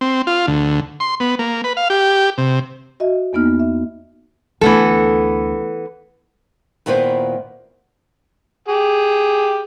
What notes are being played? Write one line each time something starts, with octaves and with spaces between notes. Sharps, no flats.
C4
F4
D2
C6
B3
A#3
B4
F5
G4
C3
F#4 D#5 E5
E2 A#3 B3 D#4 F6
E5
D2 E3 B3 A4
D#2 A#2 B3 E4 B4 C5
G4 G#4